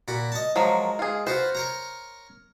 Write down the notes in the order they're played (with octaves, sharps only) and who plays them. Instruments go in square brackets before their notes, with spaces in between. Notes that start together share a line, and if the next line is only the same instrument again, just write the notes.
[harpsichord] A#2 F#4 B5
D#5 A5
[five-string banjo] F3 F#3 A#4 [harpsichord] G#3
[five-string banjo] F4 G#4
[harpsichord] F4 F#4 B4 [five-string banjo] C5
[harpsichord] A#4 C#5 A#5